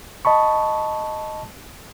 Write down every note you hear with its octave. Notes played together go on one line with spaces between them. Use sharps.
D#5 A5 B5 C#6